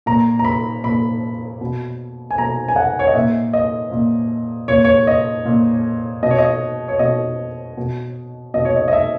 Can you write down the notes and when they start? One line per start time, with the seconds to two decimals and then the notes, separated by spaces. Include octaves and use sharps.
0.06 A#2 A#5
0.39 A#5
0.44 B5
0.84 A#2 B5
1.61 B2
2.31 G#5
2.38 B2 A#5
2.68 G#5
2.76 F#5
2.99 C#5
3.07 D#5
3.15 A#2 E5
3.53 D#5
3.91 A#2
4.68 A#2 C#5
4.84 C#5
5.07 D#5
5.45 A#2
6.23 B2 D#5
6.31 C#5
6.38 D#5
6.88 C#5
6.99 B2 D#5
7.77 B2
8.54 B2 D#5
8.65 C#5
8.76 D#5
8.88 D#5
8.93 E5